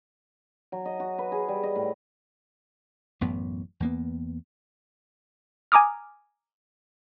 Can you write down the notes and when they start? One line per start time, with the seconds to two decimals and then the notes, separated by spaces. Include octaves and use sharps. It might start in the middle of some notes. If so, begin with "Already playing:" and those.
0.72 F#3
0.85 D#5
1.00 F#4
1.18 B4
1.32 G#4
1.48 G3
1.63 D#5
1.76 A2
3.21 A1 F#2 A2 B3
3.80 E2 A#3 B3
5.72 G#5 A#5 D6 D#6 F6